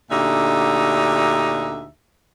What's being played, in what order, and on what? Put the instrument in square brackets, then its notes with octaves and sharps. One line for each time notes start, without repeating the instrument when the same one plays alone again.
[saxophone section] D2 A#2 D3 D#4 G4 E5